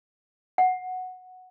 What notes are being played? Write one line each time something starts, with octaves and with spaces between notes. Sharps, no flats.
F#5